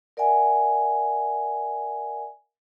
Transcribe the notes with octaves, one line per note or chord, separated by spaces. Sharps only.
A#4 D5 E5 F#5 G#5